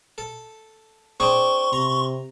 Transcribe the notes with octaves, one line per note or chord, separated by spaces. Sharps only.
A4
C4 D4 G#4 C6 C#6
C3 A#5